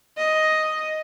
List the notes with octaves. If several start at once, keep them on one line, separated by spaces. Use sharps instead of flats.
D#5